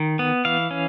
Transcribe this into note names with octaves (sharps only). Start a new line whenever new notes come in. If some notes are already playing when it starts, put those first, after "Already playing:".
Already playing: D#3
B3
E3 F5
C#4